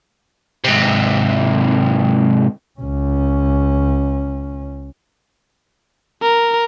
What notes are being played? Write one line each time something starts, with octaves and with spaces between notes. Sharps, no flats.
G#2 C3
C#2 C#4
A#4